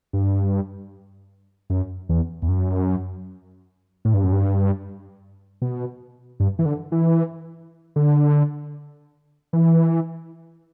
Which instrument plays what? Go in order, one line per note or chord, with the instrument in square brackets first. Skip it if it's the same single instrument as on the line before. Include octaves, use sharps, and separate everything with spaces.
[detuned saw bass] G2
F#2
E2
E2
F#2
A2
G2
F#2
G2
B2
G2
E3
D3
E3
D3
E3